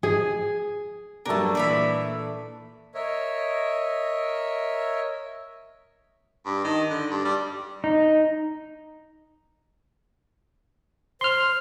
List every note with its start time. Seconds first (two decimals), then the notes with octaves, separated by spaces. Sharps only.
0.03 G#4
1.25 G2 F#3 A3 D4 A#4 A5
1.55 A#2 E3 D5 E5 B5
2.94 A#4 C#5 D#5 E5
6.46 G2
6.64 D#3
6.90 D3
7.11 G2
7.25 G3
7.84 D#4
11.21 C5 C6 F6